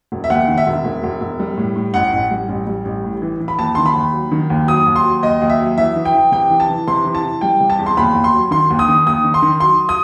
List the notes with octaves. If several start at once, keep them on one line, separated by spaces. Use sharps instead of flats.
E1
E5
D#2 F#5
D#3
E5
E1
E1
E1
E1
G3
A2
A2
A1 F#5
A1
G3
A1
G3
A1
A2
E3
E3
B5
D#2 A5
D#3 C6
B5
D#2
F#3
D#3
D#2
F#3 D#6
D#2
C6
F#3
D#2 D#5
D#2
E5
F#3
E3 E5
E3
G5
E3
C3 G5
E3
A5
E3
C3 C6
E3
A5
E3
G3 G5
C3
A5
E2
C6
D#2 B5
D#2
C6
F#3
D#3 C6
D#2
D#6
D#3
D#2 D#6
D#3
C6
D#3
F#3 C6
D#6